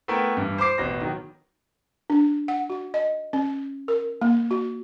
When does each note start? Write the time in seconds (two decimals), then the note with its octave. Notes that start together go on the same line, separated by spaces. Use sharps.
0.08 A3 B3 E4 A#4 B4 G5
0.37 G2 E3
0.58 C5 B5 D6 C7
0.78 A1 B2 B4 A#6
1.01 D#3 F#3
2.10 D4
2.48 F#5
2.70 F#4
2.94 D#5
3.33 C#4
3.88 A#4
4.21 A#3
4.51 F#4